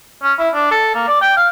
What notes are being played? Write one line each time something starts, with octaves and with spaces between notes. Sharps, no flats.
C#4
E4
D4
A4
A#3
D5
G5
F5